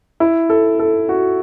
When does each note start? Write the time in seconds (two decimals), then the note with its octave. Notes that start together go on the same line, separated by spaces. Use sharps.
0.20 E4
0.50 A4
0.79 A4
1.09 F#4